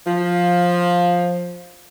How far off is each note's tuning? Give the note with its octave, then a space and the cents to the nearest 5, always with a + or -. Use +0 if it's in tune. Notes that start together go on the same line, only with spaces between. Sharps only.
F3 +10